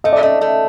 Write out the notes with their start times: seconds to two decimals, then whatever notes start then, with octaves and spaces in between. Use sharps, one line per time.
0.04 A3 D#5
0.13 D5
0.21 A3 D#5
0.41 A3